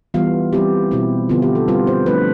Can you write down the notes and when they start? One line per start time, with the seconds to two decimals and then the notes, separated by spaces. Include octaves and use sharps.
0.14 E3 G3 B3 F4 F5
0.53 G3 C4 E4 G4
0.91 B2 G3 C4 E4
1.29 D3 F3 B3 E4 F4
1.42 G4
1.55 A4
1.68 G3 C4 F4 B4
1.87 C5
2.06 F3 A3 D4 F4 B4